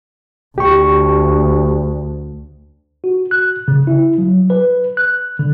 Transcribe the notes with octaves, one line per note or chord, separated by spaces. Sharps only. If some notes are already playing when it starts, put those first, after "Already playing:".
D2 G4 C#6
F#4
F#6
C#3
E4
F#3
B4
F#6
D3